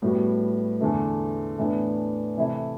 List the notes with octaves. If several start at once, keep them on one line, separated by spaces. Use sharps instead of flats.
A2 G3 B3 F#4
E2 D3 A3
A2 E3 B3 D4
C3 E3 A3 E4